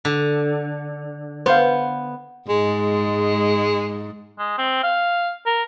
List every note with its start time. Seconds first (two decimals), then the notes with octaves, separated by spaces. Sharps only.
0.05 D3
1.46 B3 C5 F5
2.49 G#2 G#3
4.39 G#3
4.58 C4
4.83 F5
5.46 A#4